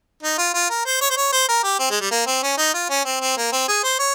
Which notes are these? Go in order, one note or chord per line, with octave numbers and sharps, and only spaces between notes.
D#4
F4
F4
A#4
C5
C#5
C5
C#5
C5
A#4
G4
C4
G#3
G3
A#3
C4
C#4
D#4
F4
C#4
C4
C4
A#3
C4
G#4
C5
C#5